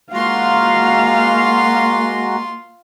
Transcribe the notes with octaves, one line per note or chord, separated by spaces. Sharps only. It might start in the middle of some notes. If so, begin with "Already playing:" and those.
G#3 A#3 F4 F#4 F5 A#5 C6